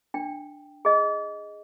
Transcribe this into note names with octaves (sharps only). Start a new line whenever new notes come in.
D4 G5
G#4 D#5